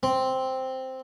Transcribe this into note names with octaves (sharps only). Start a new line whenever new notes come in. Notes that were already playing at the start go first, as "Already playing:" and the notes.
C4